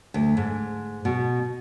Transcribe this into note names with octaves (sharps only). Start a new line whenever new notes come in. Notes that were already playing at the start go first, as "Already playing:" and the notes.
D2
G#2
B2